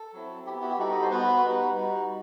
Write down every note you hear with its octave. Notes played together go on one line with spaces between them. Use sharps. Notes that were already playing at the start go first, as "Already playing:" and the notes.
Already playing: A4
F#3 C4 E4
B3 E4 G4
F#4
G4
G3 D#4 F#4 A4
D#5
C5
B3 F#4 B4
G3 B3 D#4 F#4
G3 D#4 F#4